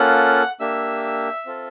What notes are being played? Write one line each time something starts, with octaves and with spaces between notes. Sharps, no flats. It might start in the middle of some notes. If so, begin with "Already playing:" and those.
Already playing: A#3 C#4 F4 A4 F#5 F#6
A#3 D4 G4 E5 E6
C4 F4 A4